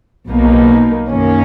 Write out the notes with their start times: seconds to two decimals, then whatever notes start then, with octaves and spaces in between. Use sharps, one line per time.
0.28 B1 B2 A#3 D#4
1.11 F#2 D#3 A#3 C#4